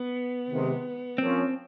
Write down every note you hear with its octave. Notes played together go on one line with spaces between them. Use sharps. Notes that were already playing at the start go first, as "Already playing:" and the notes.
Already playing: B3
C3 D#3 G#3
F3 A#3 C4 C#4